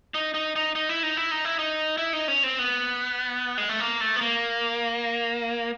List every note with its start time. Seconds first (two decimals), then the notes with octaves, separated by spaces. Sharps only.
0.14 D#4
0.34 D#4
0.56 D#4
0.75 D#4
0.89 E4
1.03 D#4
1.17 E4
1.31 D#4
1.45 E4
1.59 D#4
1.97 E4
2.13 D#4
2.28 C#4
2.43 C4
2.59 B3
3.58 G#3
3.69 A3
3.80 A#3
4.01 A3
4.16 B3
4.21 A#3